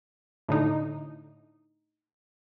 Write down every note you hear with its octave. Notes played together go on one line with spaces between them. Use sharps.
A2 D3 D#4